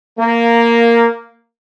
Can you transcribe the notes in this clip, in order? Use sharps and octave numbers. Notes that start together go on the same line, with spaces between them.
A#3